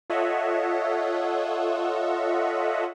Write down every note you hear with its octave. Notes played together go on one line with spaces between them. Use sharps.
F4 A4 C#5 D#5 E5 F#5